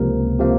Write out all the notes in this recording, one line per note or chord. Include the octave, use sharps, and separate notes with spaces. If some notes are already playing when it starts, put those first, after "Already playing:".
Already playing: C#2 C3 F3 A#3 A#4
C3 F3 A#3